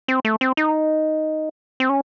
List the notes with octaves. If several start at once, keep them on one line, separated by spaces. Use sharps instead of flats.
C4
A3
C4
D#4
C4
C#4